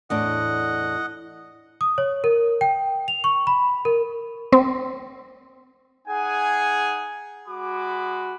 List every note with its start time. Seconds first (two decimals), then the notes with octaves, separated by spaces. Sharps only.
0.10 E2 A2 D4 D#5 F#5
1.81 D#6
1.98 C#5
2.24 A#4
2.61 G5
3.08 F7
3.24 C#6
3.47 B5
3.85 A#4
4.52 C4
6.08 D#4 G#4 F#5 G#5
7.48 G#3 F#4 B5 D6